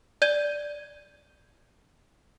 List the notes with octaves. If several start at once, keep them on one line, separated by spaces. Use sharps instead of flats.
D5 G6 G#6 D#7 G7